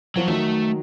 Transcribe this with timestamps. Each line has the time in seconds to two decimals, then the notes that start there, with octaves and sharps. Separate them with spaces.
0.16 F3 F#3
0.28 D#3 F#3 A3